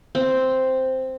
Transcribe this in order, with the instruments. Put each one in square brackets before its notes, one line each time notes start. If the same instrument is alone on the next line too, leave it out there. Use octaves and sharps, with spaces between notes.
[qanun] C4